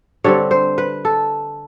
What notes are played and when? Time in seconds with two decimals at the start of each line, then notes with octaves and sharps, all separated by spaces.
0.24 D3 G3 C4 C#5
0.51 C5
0.78 B4
1.05 A4